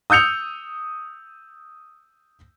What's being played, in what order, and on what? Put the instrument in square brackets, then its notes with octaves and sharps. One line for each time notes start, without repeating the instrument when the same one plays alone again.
[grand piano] D#6 E6 G6 C#7 F7